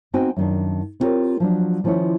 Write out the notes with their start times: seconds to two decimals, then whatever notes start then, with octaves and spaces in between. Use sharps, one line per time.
0.14 B3 C4 D#4 F#4 G5 G#5
0.36 F#2 D#3 D4
1.00 B3 C4 F4 G4 A#4 C#5
1.40 F3 F#3 D4
1.84 D#3 F3 A3 C#4 E4 C#5